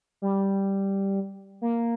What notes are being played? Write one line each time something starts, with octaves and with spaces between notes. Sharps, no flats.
G3
A#3